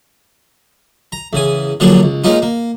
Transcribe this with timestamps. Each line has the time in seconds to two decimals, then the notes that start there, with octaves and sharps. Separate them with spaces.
1.12 A#5
1.33 E2 C#3 G#5
1.80 D3 F3 F#3 A#3 D4 G#4
2.03 C#2
2.24 G#3 A#3 C#4 D#4 F4
2.42 A#3